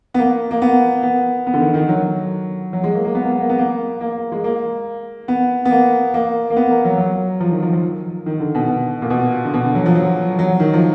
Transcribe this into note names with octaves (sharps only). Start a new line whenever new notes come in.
B3
A#3
A#3
B3
B3
B3
D3
D#3
D#3
F#3
F#3
G#3
A#3
A#3
B3
A#3
B3
A#3
B3
A#3
A#3
G#3
A#3
B3
B3
A#3
A#3
A#3
B3
A#3
F#3
F#3
F3
D#3
F3
F3
D#3
D3
B2
B2
A#2
B2
D3
B2
D3
F#3
F3
F#3
F#3
D#3
F3